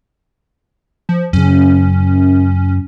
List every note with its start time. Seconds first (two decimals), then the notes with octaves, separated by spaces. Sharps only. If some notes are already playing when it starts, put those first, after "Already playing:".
1.09 F3
1.33 F#2 C#3 C#4